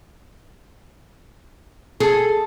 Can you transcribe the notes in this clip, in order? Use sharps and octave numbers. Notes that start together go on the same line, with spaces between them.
G#4 A4